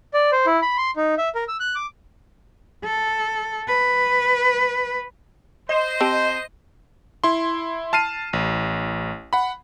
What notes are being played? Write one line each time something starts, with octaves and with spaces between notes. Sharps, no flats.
D5
C5
E4
B5
C6
D#4
E5
A#4
E6
F#6
D6
A4
B4
C5 D#5
C4 G4 A5
E4 C6
A5 F6 C7 D#7
A1
F#5 B5